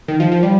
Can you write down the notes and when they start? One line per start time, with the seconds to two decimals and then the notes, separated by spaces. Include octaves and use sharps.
0.08 D#3
0.20 F3
0.32 F3
0.43 G3